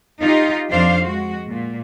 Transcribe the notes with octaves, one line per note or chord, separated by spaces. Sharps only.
D#4 F4 G4
F2 F3 D4 C5 F5
G#3 F#4
A#2